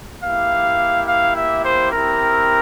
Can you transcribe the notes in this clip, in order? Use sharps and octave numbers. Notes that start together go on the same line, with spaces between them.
A#3 E4 G4 F5
F5
E5
C5
C4 E4 G4 A#4